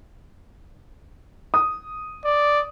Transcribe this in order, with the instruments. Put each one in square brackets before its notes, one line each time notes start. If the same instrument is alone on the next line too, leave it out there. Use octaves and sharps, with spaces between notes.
[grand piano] D#6
[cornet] D5